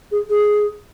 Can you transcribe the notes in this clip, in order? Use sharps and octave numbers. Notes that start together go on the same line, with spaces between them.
G#4
G#4